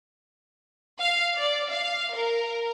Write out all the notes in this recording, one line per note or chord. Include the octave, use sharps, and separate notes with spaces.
F5
D5
F5
A#4